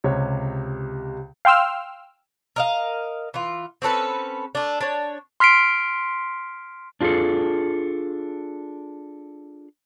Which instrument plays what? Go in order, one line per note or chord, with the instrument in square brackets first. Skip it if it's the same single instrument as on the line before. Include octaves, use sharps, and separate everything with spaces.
[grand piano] C#2 C3 C#5
[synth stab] F5 G5 C6 E6 F6
[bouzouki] A#4 D#5 F5
E3 F4
C4 C#4 A4 B4
A3 D4
D4 C#5
[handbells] C6 F6 B6 C7 D7
[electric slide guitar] D4 F4 F#4 G#4 A4